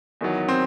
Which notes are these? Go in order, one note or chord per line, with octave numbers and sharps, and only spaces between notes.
E2 D#3 F#3
C4